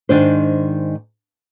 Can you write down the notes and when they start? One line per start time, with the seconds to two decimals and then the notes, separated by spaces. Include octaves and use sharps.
0.09 G#2 D#3 D4 C5